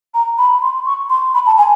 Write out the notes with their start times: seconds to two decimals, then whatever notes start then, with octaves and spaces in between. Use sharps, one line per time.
0.14 A#5
0.38 B5
0.62 C6
0.86 C#6
1.10 C6
1.34 B5
1.46 A5
1.58 G#5